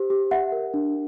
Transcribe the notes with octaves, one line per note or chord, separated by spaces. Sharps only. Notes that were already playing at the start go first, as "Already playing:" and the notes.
Already playing: G4 C5
G4
G4 E5 F#5
A#4
D4